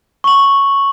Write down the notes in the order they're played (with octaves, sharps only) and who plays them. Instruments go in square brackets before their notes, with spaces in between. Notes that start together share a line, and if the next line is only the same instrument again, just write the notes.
[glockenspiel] C#6 F#7